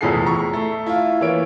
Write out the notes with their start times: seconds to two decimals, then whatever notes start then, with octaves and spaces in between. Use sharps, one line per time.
0.01 F1 A#1 E2 G#4 A4 C7
0.26 A#5 C#6
0.53 A3
0.86 E4 F4
1.21 E3 A#3 C#5 D7